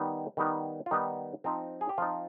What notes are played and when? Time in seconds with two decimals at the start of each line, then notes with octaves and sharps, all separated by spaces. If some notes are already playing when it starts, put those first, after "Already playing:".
Already playing: D#3 G3 B3 D#4
0.37 D#3 G3 B3 D#4
0.86 F4
0.91 D#3 G3 B3 D#4
1.44 F3 C4 D#4
1.81 G#4
1.89 G4
1.98 F3 C4 D#4 F4